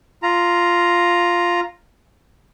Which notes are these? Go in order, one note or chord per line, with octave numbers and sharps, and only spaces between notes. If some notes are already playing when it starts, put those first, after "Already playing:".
F4 A#5